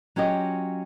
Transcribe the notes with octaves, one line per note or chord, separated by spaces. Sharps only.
F#3 C#4 F4 G4 D#5